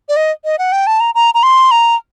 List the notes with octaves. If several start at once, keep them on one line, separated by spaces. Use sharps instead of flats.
D5
D#5
D#5
F#5
G5
A5
A#5
A#5
A#5
C6
A#5